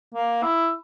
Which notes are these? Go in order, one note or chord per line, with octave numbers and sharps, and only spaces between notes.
A#3
E4